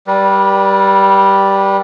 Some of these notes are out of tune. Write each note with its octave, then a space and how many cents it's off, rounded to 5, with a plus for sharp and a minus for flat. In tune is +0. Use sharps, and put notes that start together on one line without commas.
G3 +0 B4 -40